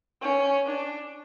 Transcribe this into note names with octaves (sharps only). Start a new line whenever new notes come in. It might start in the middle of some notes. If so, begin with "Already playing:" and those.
C#4
D4